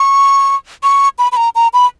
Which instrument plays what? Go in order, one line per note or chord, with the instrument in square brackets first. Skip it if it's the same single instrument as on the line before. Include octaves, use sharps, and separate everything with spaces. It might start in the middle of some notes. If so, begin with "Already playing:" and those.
Already playing: [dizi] C#6
C#6
B5
B5
A#5
A#5
B5